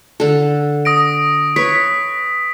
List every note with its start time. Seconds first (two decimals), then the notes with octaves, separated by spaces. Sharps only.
0.20 D3 A4
0.85 D#6 A#6 D7
1.56 B4 C#5 B6